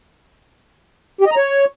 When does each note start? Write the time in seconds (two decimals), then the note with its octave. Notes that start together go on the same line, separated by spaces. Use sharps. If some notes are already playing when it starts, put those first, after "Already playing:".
1.21 G4
1.26 D#5
1.31 A#5
1.37 C#5